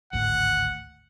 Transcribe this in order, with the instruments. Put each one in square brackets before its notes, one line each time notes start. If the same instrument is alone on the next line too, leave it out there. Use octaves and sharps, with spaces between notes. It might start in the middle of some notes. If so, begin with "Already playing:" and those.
[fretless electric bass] G#1 D2 A2 [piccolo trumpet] F#5